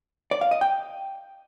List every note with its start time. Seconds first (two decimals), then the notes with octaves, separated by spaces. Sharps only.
0.31 D5
0.41 F5
0.51 D#5
0.61 G5